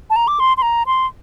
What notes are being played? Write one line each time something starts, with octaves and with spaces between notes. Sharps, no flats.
A5
A#5
D6
C6
C6
A#5
C6